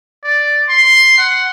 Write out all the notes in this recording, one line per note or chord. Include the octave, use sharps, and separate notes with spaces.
D5
C6
F#5